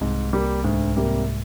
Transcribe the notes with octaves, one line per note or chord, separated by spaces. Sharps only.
C2 G#2 C3
G3 A#3
D2 G#2
C3 G3 A#3